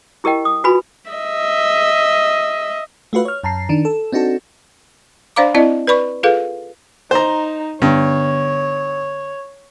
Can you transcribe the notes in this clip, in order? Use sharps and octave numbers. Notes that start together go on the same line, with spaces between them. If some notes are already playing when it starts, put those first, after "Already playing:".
E4 G4 A#4 D#5 G5
D#6
F4 F#4 B4 G#5 B5
D#5 E5
A3 F4 F#4 B4 F5
C#5 F6
F#2 A5 A#5 C7
D#3 D4
A4
C4 D4 D#4 F#4 A4
D4 C5 D5 F5 A#5 D6
C4 E4 D5 D#5
B4 D5 B5 C#6
F4 G#4 A4 B4 F5
D#4 C5 A#5
G2 D3 B3 C#5